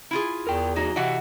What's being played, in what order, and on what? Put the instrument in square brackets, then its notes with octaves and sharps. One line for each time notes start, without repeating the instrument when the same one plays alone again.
[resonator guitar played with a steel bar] E4 F4 G#4
[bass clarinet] E2 [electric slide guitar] A#4 G5
[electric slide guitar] F2 F#4 G#4 [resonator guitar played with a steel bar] D#4
[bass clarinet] C3 [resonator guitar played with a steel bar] E3 F#4 [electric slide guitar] D#5 E5 F#5